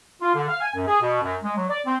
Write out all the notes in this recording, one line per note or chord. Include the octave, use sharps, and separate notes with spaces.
F4
D3
F5
G#5
F#2
G#4
B2
F#2
G#3
F#3
D5
C4